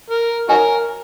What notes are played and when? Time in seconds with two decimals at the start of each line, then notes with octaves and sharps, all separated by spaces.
0.10 A#4
0.49 D#4 F#4 A#4 C#5 G#5